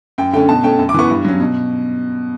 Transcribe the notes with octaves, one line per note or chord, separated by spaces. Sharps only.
F#2 G5
D3 A3 C#4 G5
B2 A5
A3 C#4 G5
F#2
D6
E3 B3 C#6
G2
F#3 C#4
B2